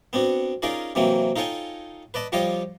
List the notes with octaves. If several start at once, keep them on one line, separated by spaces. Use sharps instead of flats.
B3 C4 D4 F#4
C#4 D#4 F4 G#4 A#4 D5
C3 E3 F#3 A#3 C4
D#4 F4 A4 C#5 G5 G#5
B4 D5 D#5 A5
F3 G3 F4 G4 C#5 D#5